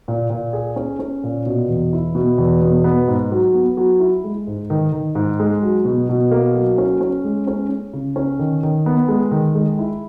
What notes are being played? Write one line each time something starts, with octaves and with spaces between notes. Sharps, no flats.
A#2
A#2
G#4
C#4
C#4
A#2
B2
E2
E4
B2
E2
B2
B3
G#2
F#3
B3
F#3
E4
G#3
G#2
D#3
D#3
G#2
G#3
F#3
B2
B2
A#3
F#3
C#4
C#4
G#3
C#4
C#4
C#3
C#4
D#3
D#3
B3
G#3
D#3
G#3
E4